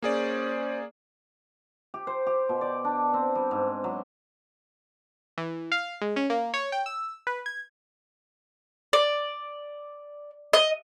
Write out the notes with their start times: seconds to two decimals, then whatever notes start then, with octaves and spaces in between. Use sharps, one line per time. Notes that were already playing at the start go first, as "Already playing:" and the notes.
0.02 A#3 C#4 G#4 C5 D5
1.94 G4
2.07 C5
2.27 G4
2.49 B2
2.61 D5
2.85 D4
3.14 C4
3.35 G3
3.51 G#2
3.84 F#3
5.38 E3
5.72 F5
6.01 G#3
6.16 C#4
6.30 A#3
6.54 C#5
6.72 G5
6.86 E6
7.27 B4
7.46 G#6
8.93 D5
10.53 D#5